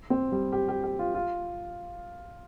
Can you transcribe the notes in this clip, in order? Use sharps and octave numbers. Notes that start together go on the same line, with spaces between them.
C4
G3
G4
G4
G4
F4
F4